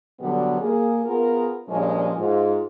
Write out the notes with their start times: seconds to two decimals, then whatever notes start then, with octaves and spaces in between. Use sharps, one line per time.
0.20 B2 D3 F#3 G3 B3
0.60 A#3 G#4
1.05 B3 F4 G#4 A#4
1.68 G2 A#2 F3 G#3 C#4 G#4
2.18 G#2 F4